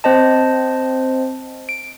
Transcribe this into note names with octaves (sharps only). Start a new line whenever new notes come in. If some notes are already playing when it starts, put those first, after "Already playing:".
C4 C5 D#5 A5
D7